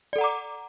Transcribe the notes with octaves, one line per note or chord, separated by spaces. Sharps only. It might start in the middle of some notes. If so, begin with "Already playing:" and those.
A4 D5 F#5 A#5 D6